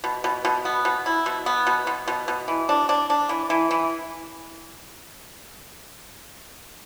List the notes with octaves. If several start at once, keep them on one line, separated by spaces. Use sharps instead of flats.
B2
B2
B2
B3
B2
E4
B2
B3
B2
B2
B2
B2
E3
D4
D4
D4
E3
E3
E3